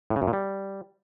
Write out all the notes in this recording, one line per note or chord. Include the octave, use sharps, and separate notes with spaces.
A2
C#3
F#2
A#2
G3